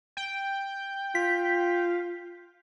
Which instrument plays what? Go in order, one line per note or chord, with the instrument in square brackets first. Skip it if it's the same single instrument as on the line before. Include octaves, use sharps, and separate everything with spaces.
[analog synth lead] G5
[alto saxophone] F4 [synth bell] B6